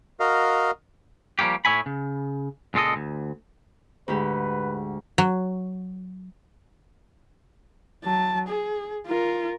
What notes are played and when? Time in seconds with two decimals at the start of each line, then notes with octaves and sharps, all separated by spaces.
0.20 F#4 A#4 D#5 F5
1.39 F3 G3 A#3 C#4 G4
1.65 A2 C#5 E5 G#5 B5
1.86 C#3
2.74 C#2 A#2 G#3 A4 D#5
2.96 D2
4.08 D2 G#2 G4 B4
5.18 F#3
8.04 F#3 A5
8.48 G#4
9.07 F4 A#4